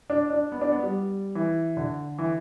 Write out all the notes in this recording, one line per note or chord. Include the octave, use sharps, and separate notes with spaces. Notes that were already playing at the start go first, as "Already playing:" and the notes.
D4
D4
B3
D4
B3
G3
E3
D3
E3